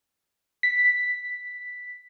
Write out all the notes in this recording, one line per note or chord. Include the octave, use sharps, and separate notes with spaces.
B6